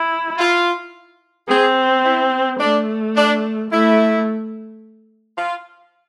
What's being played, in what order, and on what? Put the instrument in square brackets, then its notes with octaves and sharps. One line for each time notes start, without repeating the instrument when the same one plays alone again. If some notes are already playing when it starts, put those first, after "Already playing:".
Already playing: [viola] E4
[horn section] F4
[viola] C4 [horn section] G#4
[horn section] E4
[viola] A3 [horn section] D4
[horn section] D4
[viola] A3 [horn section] E4
[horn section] F4